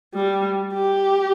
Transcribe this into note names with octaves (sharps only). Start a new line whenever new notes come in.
G3
G4